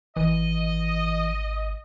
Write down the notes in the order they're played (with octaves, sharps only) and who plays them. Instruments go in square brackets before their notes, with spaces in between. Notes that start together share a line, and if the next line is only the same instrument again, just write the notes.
[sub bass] G#1 [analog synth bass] E3 [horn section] D#5